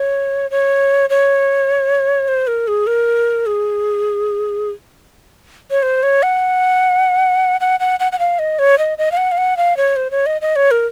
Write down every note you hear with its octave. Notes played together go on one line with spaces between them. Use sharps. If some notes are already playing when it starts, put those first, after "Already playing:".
Already playing: C#5
C#5
C#5
C5
A#4
G#4
A#4
G#4
C#5
C5
C#5
F#5
F#5
F#5
F#5
F#5
F5
D#5
C#5
D#5
D#5
F5
F#5
F5
F#5
F5
C#5
C5
C#5
D#5
D#5
C#5
A#4